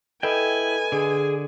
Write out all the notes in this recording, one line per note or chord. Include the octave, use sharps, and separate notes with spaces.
E4 A4 B4 D#5 G5 G#5
D3 G#4